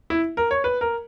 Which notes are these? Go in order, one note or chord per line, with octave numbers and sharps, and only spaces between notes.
E4
A#4
C#5
B4
A#4